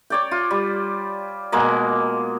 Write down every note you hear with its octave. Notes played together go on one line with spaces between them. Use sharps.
C#5 D5 G5
F4
G3
B2 G#3 A#3